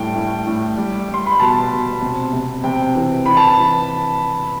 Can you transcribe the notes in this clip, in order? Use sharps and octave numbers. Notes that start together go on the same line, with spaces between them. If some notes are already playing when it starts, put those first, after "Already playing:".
Already playing: A2 G3 G5
A2
A2
G3
G3
C6
B5
B2 A5
B2
C3
C3
C3 G5
E3
E3 B5
A5
B5
E3